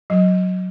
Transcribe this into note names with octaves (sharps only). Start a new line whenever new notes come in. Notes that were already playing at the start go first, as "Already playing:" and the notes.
F#3